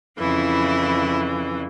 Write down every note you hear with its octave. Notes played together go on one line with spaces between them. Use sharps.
F2 C#3 E3 E4